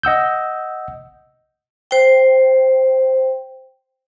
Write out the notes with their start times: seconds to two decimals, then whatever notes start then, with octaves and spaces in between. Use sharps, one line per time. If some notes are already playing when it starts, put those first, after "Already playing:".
0.03 D#5 F#5 E6 G6
1.91 C5 G5